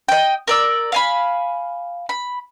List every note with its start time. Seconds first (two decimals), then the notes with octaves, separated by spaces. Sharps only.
0.08 D#5 G5
0.48 A#4 D5 E6
0.92 F5 G#5 B5
2.09 B5